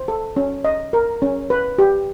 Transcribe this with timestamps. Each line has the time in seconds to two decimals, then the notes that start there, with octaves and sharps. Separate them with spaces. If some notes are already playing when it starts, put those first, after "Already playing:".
Already playing: C5
0.08 A4
0.37 C#4
0.65 D#5
0.93 A#4
1.22 C#4
1.50 B4
1.78 G4